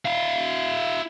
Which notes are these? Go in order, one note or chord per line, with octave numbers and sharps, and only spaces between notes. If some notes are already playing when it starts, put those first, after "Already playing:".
E4 F5